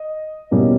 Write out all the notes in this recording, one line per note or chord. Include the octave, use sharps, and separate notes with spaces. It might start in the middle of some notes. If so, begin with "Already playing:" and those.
Already playing: D#5
E2 B2 G3 A#3 C#4